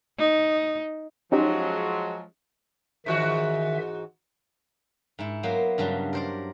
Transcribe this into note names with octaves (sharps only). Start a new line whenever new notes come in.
D#4
F3 F#3 G#3 C#4 D#4 G4
G#2 D#3 E3 F#4 E5
G#2 E4
F#3 A#3 B3 C5
G2 C#3 F#3 G3
A#4 C5 D5